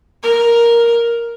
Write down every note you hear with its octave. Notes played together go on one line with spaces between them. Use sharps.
A#4